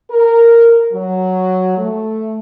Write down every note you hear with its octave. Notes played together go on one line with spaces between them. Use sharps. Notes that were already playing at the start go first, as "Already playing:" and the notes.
A#4
F#3
A3